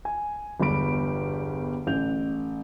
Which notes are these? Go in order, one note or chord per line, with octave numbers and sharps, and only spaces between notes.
G#5
G1 E2 G3 G4 B5 D7
A1 G6 F7